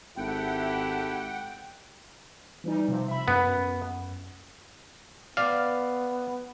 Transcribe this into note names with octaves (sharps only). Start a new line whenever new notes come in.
G#1 E4 G4 A4 F#5 G5
E3 G3 D#4
C3 F3
E5 B5
F#2 B3
B3 D5 F5